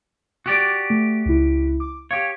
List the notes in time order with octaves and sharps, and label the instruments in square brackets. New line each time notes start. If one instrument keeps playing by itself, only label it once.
[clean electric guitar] F#4 G4 D5
[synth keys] A3
C#2 E4
D6
[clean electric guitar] G4 C#5 [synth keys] F5